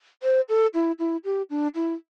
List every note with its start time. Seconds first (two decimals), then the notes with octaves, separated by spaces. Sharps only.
0.23 C5
0.49 A4
0.74 E4
0.99 E4
1.25 G4
1.50 D4
1.75 E4